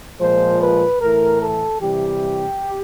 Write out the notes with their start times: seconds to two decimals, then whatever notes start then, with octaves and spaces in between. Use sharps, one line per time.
0.20 A#2 F3 G#3 C5
0.60 B4
1.00 A2 E3 A3 A#4
1.41 A4
1.81 C3 E3 G3 G4